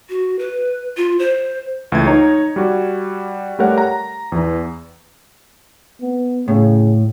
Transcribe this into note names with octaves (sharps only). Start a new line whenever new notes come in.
F#4
B4
F4
C5
C#2 E3 A3 G#6
D#4 C#5 A#5
G3 F#4
G3 A3 G4 A#4 C#5 F#5
A#5
E2 E3
B3
A2 C#3